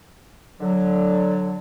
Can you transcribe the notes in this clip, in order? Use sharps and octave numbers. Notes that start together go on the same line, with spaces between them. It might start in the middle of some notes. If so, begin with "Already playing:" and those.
D3 F#3